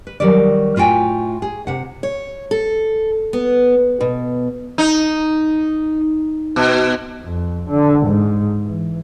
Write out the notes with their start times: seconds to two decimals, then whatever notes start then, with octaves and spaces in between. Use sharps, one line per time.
0.07 B4
0.20 D#3 F#3 G3 D5
0.76 A2 F4 F#4 G5 G#5
1.42 G#4
1.67 C3 F#5
2.03 C#5
2.51 A4
3.33 B3
4.01 B2
4.78 D#4
6.56 B2
7.22 F2
7.69 D3
8.07 G#2
8.64 E3